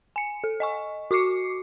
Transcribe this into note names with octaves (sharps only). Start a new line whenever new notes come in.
G#5 C#7
A4
D#5 G#5 C#6
F#4 C#6 D6 C7 C#7